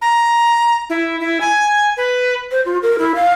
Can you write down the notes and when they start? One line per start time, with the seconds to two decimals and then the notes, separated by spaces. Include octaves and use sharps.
0.02 A#5
0.90 E4
1.20 E4
1.41 G#5
1.97 B4
2.52 C5
2.66 F4
2.83 A#4
2.99 E4
3.15 F5